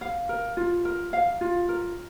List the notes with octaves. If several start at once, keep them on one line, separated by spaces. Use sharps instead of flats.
F5
A#4
F4
A#4
F5
F4
A#4